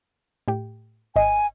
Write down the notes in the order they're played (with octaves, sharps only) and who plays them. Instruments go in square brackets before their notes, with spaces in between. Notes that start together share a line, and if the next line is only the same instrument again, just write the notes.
[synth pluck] A2 G4
[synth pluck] G#1 D#5 [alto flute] G#5